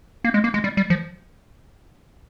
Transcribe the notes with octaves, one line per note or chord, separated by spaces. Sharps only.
A#3
G#3
A#3
G#3
G3
G3
F3